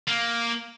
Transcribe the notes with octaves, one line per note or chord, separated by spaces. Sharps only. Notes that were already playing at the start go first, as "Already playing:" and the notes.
A#3